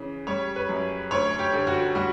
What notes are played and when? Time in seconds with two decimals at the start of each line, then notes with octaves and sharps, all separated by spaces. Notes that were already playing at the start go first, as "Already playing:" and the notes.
Already playing: C#3 E3
0.27 G3 C#5
0.56 B4
0.69 F#2
1.11 D2 C#5
1.39 G4
1.53 D3
1.67 F#4
1.95 G3 F#4